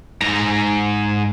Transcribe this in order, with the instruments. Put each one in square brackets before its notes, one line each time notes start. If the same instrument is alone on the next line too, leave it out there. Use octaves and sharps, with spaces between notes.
[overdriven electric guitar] G#2 A#5